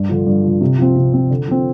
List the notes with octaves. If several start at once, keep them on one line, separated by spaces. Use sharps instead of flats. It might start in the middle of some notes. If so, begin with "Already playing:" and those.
Already playing: G2
D3 F3
G2
D3 F3
C3
F3 C4
C3
F3 C4
D3
F3 C4